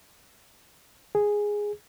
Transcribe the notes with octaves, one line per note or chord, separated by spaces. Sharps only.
G#4